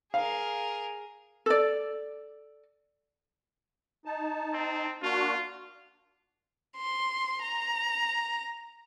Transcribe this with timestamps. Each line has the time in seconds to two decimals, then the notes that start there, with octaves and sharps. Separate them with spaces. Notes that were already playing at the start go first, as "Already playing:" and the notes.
0.14 G#4 A#4 F5
1.46 A4 D5
4.05 D#4 A5
4.54 C4
5.03 A#3 D4 F4 F#4
6.77 C6
7.42 A#5